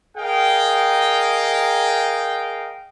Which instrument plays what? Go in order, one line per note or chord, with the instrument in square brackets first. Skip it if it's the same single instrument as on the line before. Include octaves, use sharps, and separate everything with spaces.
[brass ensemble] G#4 A#4 D#5 F5 G5